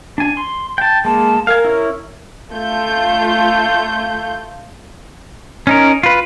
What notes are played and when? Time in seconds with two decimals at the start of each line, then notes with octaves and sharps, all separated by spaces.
0.18 D4 G#5
0.37 C6
0.78 G5 A5
1.05 G#3 A#3 A5
1.47 A#4 F5 G#5
1.65 C#4 E4
2.52 A3 F4 G6
5.67 C#4 D#4 A#4
6.03 F4 B4